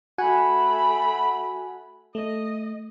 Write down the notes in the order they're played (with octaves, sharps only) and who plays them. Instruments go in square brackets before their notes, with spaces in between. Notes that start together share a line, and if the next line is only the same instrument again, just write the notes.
[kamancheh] A3 B5 [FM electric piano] F#4 F#5 G#5
[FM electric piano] A3 [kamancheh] D#5